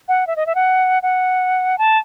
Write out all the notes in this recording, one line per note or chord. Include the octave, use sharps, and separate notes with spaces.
F#5
E5
D#5
E5
F#5
F#5
A5